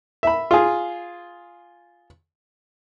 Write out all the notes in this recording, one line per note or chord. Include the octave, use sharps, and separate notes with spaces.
E5 B5
F4 G#4